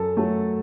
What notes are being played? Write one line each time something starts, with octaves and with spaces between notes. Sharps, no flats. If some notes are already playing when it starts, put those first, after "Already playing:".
Already playing: F#2 A4
F#3 A3